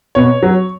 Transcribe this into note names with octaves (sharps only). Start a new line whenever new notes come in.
B2 C#5
F#3